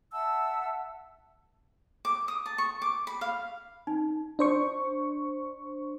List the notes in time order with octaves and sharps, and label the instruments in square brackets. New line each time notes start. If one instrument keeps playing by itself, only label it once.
[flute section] E5 F#5 A5 E6
[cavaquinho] D6
D#6
A5
C#6
D6
B5
F5
[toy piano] D#4
[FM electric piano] D4 C5 C#6